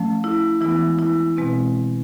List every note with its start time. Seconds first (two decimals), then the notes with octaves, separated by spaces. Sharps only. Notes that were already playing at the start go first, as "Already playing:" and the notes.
Already playing: F3 A3 C#4
0.24 E4
0.61 E3 G#3 B3 E4
0.99 E4
1.37 B2 G#3 C4